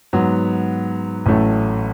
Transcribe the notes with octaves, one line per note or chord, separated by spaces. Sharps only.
G#2 F#3 B3
A1 A2 F#3 A3 C#4